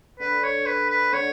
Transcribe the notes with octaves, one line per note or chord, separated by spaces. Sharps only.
D3 B4
C#5
B4
B4
D3 C#5